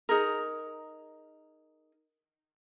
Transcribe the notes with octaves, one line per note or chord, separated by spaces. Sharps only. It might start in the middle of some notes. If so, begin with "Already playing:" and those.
D#4 G#4 A#4